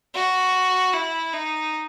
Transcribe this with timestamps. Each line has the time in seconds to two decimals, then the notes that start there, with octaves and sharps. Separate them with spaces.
0.14 F#4
0.93 E4
1.33 D#4